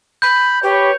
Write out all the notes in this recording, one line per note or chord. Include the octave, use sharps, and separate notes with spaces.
B5 G6
G4 B4 C#5